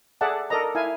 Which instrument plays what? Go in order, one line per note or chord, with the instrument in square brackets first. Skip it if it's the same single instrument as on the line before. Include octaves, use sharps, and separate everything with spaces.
[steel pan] G#4 A4 D5 E5 F#5 A5
A4 A#4 D5 D#5 A#5
E4 F5 G#5